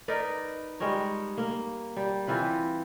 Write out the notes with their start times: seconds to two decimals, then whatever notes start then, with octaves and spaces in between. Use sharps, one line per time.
0.08 D#4 A#4 B4 D5
0.80 G3 G#3 A#4 C#5
1.37 A#3
1.96 G3
2.27 E3 C4 F4 B4